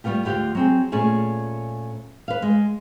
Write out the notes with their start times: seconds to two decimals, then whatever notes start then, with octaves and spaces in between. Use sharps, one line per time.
0.04 G3 A3 B3 F4 G4
0.25 D2 D3 F4 G4 F#5
0.55 F#3 C4 G#4
0.92 A#2 A3 C#4 G#4 G#5
2.28 B4 F5
2.42 G#3